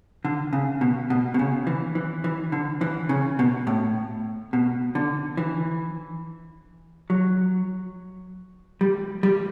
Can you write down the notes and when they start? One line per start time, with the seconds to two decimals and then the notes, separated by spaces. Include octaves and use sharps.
0.25 D3
0.53 C#3
0.81 B2
1.10 B2
1.34 B2
1.39 C#3
1.67 E3
1.95 E3
2.24 E3
2.52 D3
2.81 E3
3.09 C#3
3.39 B2
3.67 A2
4.53 B2
4.95 D3
5.37 E3
7.10 F#3
8.81 G3
9.23 G3